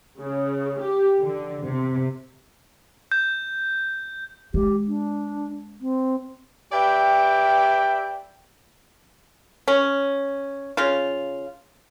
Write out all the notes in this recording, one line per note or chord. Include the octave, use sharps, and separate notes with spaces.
C#3
G4
D3
C3
G6
G#3 G4
D4
C4
G4 B4 D5 E5 G5
C#4
C#3 F4